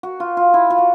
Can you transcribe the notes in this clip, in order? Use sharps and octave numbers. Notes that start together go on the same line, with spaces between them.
F#4
F4
F4
E4
F4
F#4